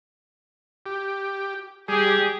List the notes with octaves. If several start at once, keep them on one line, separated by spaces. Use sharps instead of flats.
G4
G3 G4 G#4